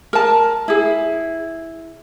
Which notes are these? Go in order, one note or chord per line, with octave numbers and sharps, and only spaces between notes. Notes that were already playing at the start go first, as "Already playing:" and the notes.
A#4 A5
E4 G#4